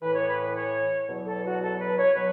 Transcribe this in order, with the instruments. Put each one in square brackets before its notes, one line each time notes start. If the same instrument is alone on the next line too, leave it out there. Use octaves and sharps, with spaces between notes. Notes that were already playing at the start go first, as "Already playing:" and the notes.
[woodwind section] A2 E3 B4
C#5
B4
B4
C#5
E2 B2 F#3
A4
F#4
A4
B4
C#5
B2 F#3 B4